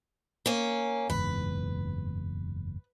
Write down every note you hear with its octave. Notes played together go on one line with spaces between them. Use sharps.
A#3 C#4
F#1 E2 G#2 B4